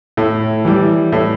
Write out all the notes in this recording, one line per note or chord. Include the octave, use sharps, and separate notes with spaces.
A2
E3 G3
A2